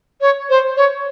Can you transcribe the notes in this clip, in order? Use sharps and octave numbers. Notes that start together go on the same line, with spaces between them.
C#5
C5
C#5